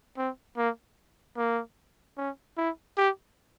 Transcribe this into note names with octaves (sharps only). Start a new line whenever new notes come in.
C4
A#3
A#3
C#4
E4
G4